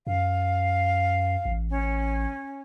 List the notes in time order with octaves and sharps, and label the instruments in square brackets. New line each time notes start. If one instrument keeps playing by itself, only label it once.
[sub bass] F#2 [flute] F5
[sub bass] A1
[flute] C#4